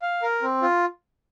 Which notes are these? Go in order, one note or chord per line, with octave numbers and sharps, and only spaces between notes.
F5
A#4
C4
F4